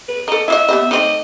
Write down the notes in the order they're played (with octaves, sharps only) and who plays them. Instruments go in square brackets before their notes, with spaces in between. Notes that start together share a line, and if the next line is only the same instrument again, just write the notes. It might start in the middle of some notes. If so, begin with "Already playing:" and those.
[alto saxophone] B4
[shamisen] A4 A#4 [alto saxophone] D#5
[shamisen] E4 F4 D#5 [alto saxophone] E5
[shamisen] B3 G4 D#5
[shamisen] A3 C4 D#4 [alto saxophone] D#5